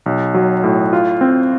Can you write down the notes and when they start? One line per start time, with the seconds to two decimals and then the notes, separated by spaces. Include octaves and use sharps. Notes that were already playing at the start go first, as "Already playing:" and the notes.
0.06 B1
0.34 F#3
0.64 A2
0.93 F4
1.21 C4